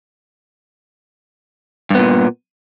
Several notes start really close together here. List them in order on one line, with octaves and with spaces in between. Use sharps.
G2 B3 A#2